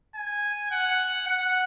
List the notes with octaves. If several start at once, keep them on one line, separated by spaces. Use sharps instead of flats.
G#5
F#5
F#5